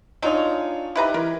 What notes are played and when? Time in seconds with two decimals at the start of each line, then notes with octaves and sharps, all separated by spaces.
0.22 F#3 G#3 D4 D#4 F4 C#5
0.95 D#4 E4 G4 B4 A#5
1.14 E3 A#4